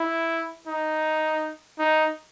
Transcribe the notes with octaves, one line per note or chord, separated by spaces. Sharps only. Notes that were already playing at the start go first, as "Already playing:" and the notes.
Already playing: E4
D#4
D#4